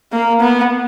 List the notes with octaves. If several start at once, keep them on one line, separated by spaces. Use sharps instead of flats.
A#3
B3